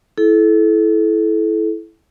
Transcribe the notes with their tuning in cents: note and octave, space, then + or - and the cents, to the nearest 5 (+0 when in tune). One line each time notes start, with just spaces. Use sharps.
E4 +0 A4 -30